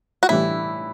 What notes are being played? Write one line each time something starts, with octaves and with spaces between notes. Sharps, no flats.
F#4
A2 E3 G3 E4